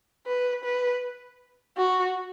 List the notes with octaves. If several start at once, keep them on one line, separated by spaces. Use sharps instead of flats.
B4
B4
F#4